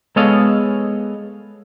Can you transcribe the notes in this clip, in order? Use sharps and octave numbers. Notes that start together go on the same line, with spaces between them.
G#3 B3 A4 C#5 D#5 F5